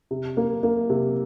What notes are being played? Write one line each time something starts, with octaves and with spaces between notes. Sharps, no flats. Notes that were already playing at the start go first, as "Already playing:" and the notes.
C3
A#3
A#3
C3